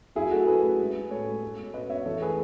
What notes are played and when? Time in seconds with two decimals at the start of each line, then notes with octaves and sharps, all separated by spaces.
0.15 F#3 E4 G#4
0.31 A3 F#4 A4
0.47 A3 G#4 B4
0.63 A3
0.79 G#3
0.95 G#3
1.10 A2 A4 C#5
1.26 G#3
1.43 G#3
1.58 B2
1.74 B2 B4 D#5
1.90 B2 C#5 E5
2.05 E3 A4 C#5
2.21 A3 G#4 B4